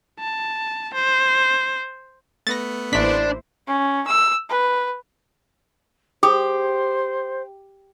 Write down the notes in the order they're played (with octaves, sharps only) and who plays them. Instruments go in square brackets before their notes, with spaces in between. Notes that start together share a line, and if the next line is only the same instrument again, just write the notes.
[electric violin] A5
C5
[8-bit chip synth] A3 B3 B4 [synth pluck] A6 A#6
[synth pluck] A1 B6 [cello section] A#3 E4 C5 [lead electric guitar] D4 D5
[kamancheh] C#4
E6
B4
[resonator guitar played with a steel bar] G4 [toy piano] G#4 D#6 [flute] C5